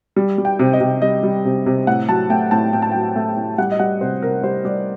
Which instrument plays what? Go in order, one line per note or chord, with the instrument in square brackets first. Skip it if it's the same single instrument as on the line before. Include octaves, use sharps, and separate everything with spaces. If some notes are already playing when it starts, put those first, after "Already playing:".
[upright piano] G3
G3
G5
C3
D#5
C3
G3 D#5
G3
C3
C3
A2 F#5
F#3 A5
A3 G5
A2 A5
A2 G5
A5
F#3 G5
A3
A2
G3 F#5
D#5
G3 F#5
C3 C5
C3 A#4
G3 C5
G3 D5